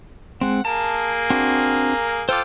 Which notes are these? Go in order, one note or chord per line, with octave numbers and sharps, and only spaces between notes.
G#3 C4 F#5
A#3 G#4 A#4 A5
C4 D4 F#4
F4 A4 C5 G5 D6